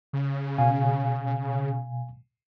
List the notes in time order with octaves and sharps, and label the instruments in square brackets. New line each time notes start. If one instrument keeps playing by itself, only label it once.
[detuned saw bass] C#3
[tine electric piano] B2 F5 G#5